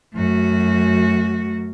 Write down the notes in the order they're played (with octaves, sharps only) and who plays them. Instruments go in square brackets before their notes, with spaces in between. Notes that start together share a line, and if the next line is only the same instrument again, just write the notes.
[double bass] F#2 [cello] A3 F#4